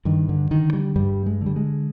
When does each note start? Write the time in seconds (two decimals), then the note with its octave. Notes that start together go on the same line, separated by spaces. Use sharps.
0.05 G2 D#3
0.29 D3
0.51 D3 D#3
0.73 G3
0.96 G2 G3
1.26 G#3
1.41 D3
1.46 G3
1.56 G#3